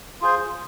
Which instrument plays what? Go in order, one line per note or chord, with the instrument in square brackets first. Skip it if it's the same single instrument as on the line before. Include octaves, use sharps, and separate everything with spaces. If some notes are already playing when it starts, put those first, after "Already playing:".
[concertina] F4 G#4 C5